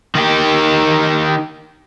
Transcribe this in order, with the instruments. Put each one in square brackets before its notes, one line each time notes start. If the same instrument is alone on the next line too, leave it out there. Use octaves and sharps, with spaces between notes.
[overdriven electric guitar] D#3 G4